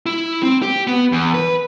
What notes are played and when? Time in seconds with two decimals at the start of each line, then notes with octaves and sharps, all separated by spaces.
0.06 E4
0.43 C4
0.62 G4
0.87 B3
1.12 E2
1.34 B4